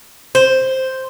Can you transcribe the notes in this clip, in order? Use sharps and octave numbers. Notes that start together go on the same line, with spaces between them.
C5